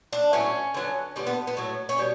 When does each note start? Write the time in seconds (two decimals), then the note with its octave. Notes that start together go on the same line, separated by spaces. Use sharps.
0.13 D4
0.33 A2 F#3 B3 C#4
0.74 D3 F#3 B3
1.16 D3 G3 B3 C#4
1.26 B3
1.47 B3
1.57 A2 F#3 A3
1.89 C#4
1.98 B2 G3 B3